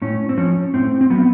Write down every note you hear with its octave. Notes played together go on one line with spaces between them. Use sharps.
A2 C#4
C4
F3 C#4
A2 C4
C4
F#3 B3